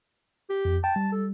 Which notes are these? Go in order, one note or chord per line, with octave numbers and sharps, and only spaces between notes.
G4
F2
G5 A5
G3
A4